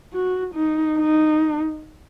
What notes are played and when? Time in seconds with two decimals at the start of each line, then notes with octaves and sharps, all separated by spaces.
0.13 F#4
0.55 D#4
0.98 D#4